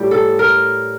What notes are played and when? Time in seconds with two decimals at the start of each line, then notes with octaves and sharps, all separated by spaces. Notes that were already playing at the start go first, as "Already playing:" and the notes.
Already playing: A2 G3 G4
0.11 A4
0.39 A#4